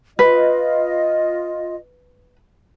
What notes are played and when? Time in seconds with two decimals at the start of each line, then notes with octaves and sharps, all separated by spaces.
0.19 F4 B4 D#5